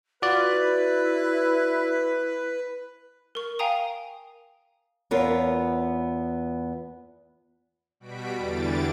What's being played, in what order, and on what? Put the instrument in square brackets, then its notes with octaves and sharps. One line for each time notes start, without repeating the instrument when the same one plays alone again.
[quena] F4 [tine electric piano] F#4 D5 [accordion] B4
[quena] E4
[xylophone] A#4 C#6
F5 G5 G#5 A#5 D#6
[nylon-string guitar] E2 B3 F4 A#4 C#5
[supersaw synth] B2 G3 F#4 B6 D7
E2 D3 E3 G3 A6 D7